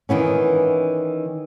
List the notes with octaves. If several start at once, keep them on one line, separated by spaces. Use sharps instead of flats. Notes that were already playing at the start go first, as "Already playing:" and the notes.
D#3 E3 B3 C#4